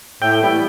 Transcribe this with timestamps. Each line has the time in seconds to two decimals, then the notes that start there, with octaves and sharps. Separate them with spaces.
0.22 A2 G5
0.41 E3 G3 B3 E4